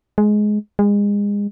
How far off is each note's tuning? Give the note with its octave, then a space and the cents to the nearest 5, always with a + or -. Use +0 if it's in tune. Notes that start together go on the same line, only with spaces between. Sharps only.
G#3 +15
G#3 -30